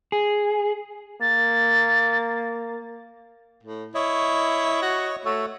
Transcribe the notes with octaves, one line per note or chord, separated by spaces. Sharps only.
G#4
A#3 A6
A2
E4 C#5 D#5 C#6
F#4
A3 F#4 C#5 E5